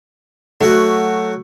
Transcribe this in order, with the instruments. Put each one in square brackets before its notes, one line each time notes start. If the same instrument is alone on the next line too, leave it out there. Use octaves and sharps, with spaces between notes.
[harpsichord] F#3 F#4 [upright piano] A3